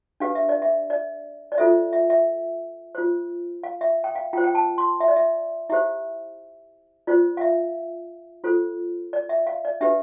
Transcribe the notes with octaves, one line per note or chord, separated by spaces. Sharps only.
D4 G4 B4 F5
E5
D5
E5
D5
D5
F4 A4 C5 E5
E5
E5
F4 C5
F5
E5
G5
F5
F4 C5 G5
G5
A5
C6
E5
D5
E5
E4 G4 C5 E5
F4 C5 D5
F5
E5
F4 A4 C5
D5
E5
F5
D5
D4 G4 B4 E5